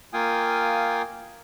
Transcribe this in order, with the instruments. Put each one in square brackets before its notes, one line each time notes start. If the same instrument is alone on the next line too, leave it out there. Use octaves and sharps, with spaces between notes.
[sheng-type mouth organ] A#3 F4 F5 G5 G#5 D#6